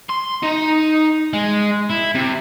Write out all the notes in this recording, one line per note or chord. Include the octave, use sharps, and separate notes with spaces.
C6
D#4
G#3
E4
C3